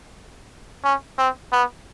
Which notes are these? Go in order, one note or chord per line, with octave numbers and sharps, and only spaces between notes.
C#4
C4
B3